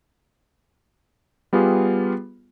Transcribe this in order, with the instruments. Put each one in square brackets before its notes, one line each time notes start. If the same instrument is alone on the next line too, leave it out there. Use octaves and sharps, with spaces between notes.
[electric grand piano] G3 B3 F4 G4 G#4